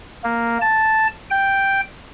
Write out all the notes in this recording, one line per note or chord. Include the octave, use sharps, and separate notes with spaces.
A#3
A5
G5